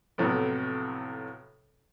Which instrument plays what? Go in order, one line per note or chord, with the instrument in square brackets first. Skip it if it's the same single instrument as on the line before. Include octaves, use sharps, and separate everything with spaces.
[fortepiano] F2 A2 C3 F#3 B3